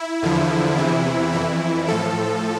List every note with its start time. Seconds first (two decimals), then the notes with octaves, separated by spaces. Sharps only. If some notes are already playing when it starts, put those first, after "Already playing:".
Already playing: E4
0.22 E2 D3 F3
0.78 E2 C3 E3
1.32 F2 E3 E4
1.87 A2 F3 A4